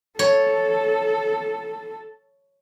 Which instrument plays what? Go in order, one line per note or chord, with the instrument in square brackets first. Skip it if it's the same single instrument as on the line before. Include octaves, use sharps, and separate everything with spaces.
[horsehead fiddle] A4 [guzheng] C#5